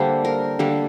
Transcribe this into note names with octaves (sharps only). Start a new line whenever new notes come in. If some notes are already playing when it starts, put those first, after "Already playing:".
Already playing: D3 G3 A#3 D4 G4 C5
A#4
D3 G3 A#3